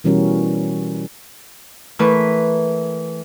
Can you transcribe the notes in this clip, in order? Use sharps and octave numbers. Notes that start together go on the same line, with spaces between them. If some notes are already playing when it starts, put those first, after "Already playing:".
B2 E3 G3 C#4 F#4 A#4
E3 A3 A#4 B4